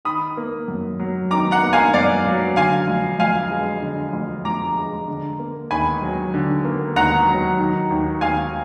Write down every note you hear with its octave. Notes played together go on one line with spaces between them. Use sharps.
D#3 B5 D#6
A#3
F#2
F#3
D#3 A#5 D6
F#5 A#5
A#3
F5 G#5
F#2 D5 F5
F#3
D3 F5 G#5
F2
F2 F5 G#5
G#3
D3
F2
F2 A#5 D6
G#3
D3
A#3
D#2 G#5 B5
F#3
D3
A#3
D#2 F#5 A#5
F#3
D#3
D#2
D#2 F5 G#5